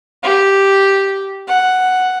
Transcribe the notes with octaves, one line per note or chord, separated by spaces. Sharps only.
G4
F#5